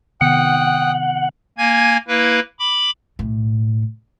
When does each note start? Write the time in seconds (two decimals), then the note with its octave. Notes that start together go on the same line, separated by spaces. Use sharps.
0.21 C3 D#3 B3 F#5 G5 D#6 F#6
1.58 A#3 G#5 G#6
2.08 A#3 E4 B4
2.59 B5 D6
3.19 B1 A2